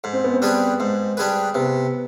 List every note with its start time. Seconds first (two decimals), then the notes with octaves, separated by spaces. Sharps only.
0.04 G#2
0.13 C4
0.24 B3
0.33 C4
0.42 G3 D4 G#4 B4
0.80 G#2
1.17 G3 D4 G#4 B4
1.55 C3 B3